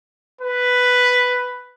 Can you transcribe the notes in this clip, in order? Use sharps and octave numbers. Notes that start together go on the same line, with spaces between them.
B4